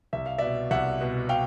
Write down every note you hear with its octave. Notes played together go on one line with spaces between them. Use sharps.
C2 E5
F5
B2 D5 E5
C2 E5 F#5
B2
F5 G5